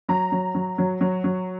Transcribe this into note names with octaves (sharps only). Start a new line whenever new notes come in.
F#3 A#5
F#3
F#3
F#3
F#3
F#3